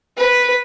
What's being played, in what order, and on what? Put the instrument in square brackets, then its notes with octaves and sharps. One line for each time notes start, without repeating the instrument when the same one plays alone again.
[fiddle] B4